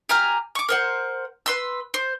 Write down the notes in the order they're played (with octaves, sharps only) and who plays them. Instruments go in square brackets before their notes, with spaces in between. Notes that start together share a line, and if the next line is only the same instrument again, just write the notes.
[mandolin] G4 G#5 A#5 F6
C#6 D6
A#4 C5 F#5
B4 C6 E6
C5